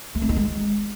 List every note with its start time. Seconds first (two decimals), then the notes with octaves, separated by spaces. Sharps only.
0.15 A3
0.22 C#4
0.29 D#4
0.36 G#3